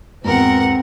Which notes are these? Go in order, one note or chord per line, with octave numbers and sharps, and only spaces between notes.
G#1 E2 C4 A#4 F#5